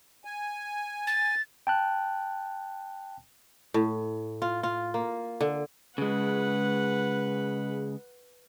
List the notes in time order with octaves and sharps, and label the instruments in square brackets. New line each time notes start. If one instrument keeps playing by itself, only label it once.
[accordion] G#5
[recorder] A6
[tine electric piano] G5 A5 F#6
[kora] A2
F4
F4
A#3
D3
[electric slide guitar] C#3 G#3 [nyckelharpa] B4 F#5